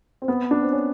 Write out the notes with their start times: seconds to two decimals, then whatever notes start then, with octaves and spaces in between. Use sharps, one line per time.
0.22 C4
0.28 B3
0.51 D4
0.62 C4
0.72 C#4